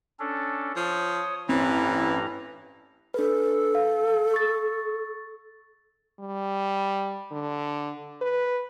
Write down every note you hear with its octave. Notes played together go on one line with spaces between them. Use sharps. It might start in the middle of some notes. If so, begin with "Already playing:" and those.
C#4 D4 A4
F3 C#5 D#6
A1 G2 E3 C4 C#4 C5 A#5
D4 A4 B4
F5
C#6 A6
G3
D3
B4